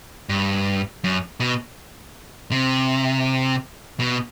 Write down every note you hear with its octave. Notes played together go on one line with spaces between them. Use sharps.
G2
F#2
B2
C3
B2